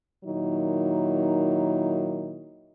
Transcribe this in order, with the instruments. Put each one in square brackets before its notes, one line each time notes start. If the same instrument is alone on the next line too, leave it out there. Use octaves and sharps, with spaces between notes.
[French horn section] A#2 D#3 F#3 D#4 E4